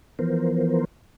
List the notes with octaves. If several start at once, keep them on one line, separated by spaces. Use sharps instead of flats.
E3 F3 B3 A#4 C5